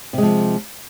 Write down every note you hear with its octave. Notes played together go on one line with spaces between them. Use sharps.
C3 F3 G#3